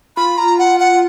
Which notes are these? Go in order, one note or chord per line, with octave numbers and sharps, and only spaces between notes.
F4 B5
A#5
F#5
F#5